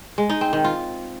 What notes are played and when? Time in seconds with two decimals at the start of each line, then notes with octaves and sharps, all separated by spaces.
0.18 G#3
0.29 D#4
0.41 C4
0.53 D#3
0.64 F4